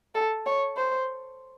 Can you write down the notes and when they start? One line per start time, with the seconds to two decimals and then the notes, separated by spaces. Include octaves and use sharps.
0.14 A4
0.46 C#5
0.76 C5